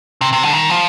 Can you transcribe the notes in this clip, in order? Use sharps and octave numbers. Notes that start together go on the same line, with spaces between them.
C3
C3
D3
D#3
F3